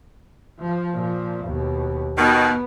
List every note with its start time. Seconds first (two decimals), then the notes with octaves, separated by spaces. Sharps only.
0.60 F3
0.94 A#2 F3
1.45 D#2 B2
2.17 B2 D#3 B3